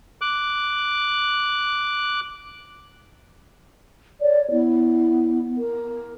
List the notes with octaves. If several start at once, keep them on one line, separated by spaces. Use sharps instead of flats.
D6 F#6
C#5 D5
B3 E4
A#4